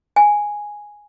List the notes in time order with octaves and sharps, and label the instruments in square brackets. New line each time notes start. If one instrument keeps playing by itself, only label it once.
[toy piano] G#5